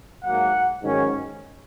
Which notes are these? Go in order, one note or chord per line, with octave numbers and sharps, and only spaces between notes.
G#2 F#3 A#3 F#5
G#2 D#3 F#3 C#4